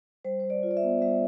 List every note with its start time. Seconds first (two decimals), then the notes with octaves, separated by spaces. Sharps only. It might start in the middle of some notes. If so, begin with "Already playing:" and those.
0.25 G3 C5
0.40 G3 C5
0.50 D5
0.63 F4
0.71 D5
0.77 E5
0.83 B3
1.02 G3 E5